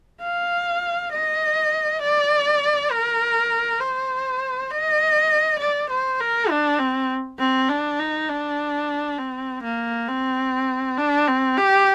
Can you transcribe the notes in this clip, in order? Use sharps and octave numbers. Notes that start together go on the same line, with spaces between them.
F5
D#5
D5
A#4
C5
D#5
D5
C5
A#4
D4
C4
C4
D4
D#4
D4
C4
A#3
C4
D4
C4
G4